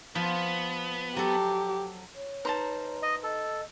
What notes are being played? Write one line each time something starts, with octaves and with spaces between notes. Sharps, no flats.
F3 B3
F#3 G4 A4
C#5
D#4 B4 C5 A5 A#5 C6
D#5
A4 D#5